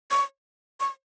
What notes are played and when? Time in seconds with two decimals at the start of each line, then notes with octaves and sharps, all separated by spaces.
0.11 C#6
0.80 C#6